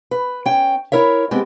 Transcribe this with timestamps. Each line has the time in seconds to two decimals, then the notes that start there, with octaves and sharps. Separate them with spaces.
0.11 B4
0.46 C#4 G5
0.92 E4 A#4 C#5 E5
1.31 G#3 B3 C4 G4